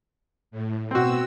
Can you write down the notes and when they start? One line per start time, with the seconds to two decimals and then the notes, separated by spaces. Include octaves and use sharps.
0.51 A2
0.91 B2 C4 F#4 E6